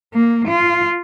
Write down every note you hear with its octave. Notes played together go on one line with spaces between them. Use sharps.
A#3
F4